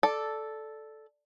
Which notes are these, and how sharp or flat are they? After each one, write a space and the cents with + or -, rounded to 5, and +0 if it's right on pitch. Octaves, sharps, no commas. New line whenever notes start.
A4 -5 D5 +0